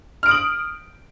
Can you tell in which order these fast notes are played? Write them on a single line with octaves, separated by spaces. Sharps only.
F6 D7 D#6 F#7